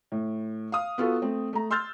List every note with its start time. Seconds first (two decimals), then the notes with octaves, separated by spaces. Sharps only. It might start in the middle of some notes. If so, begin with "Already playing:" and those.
0.12 A2
0.72 F5 D#6
0.98 B3 F4 F#4 A4
1.22 A3 C4
1.53 A3 A#5
1.71 C6 E6 F6 G6 A6